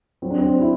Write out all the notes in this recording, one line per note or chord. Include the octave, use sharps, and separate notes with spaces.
F#3 C4
D4
C4
E4